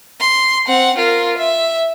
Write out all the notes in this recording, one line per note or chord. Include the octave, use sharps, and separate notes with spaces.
C6
C4 F#5
F4 A#4
E5